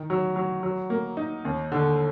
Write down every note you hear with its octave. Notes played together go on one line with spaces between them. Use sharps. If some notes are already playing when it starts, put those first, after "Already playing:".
Already playing: D#3
F#3
F#3
F#3
A#3
D#4
D#2
D3